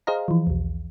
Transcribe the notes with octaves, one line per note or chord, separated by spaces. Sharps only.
G#4 C5 D#5 F5 A#5
E3 F3
B1 E2